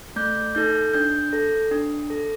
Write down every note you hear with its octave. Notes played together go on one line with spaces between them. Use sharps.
A3 G6
D#4 A4 G6
D4 G6
A4
D4
A4